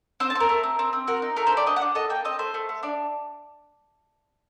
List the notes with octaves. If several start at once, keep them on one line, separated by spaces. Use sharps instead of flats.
C4 C5
A5
C4
A#4
A3
C4
C4
C4
F#4 A#4
D#4
A3 A#4
C5
G4 D5
D4 D#5
F#5
D4
A4 D#5
A#3 G5
C4 D#5
A3 C5
A3
A3
D4 D5